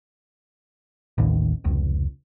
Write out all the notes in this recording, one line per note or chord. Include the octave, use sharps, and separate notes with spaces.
A1 D#2
F1 C#2